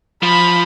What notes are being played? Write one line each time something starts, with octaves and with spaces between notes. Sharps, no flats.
F3 B5